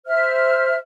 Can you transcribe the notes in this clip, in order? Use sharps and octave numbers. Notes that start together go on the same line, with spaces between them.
C5 E5 F6